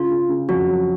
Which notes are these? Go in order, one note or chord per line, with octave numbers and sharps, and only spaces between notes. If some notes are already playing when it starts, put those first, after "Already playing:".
Already playing: C#3 F4
C#3
C#3
F2 F#4
F#3